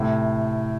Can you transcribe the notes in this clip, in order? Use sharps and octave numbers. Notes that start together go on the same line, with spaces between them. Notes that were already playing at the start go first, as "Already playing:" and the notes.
Already playing: A2 C3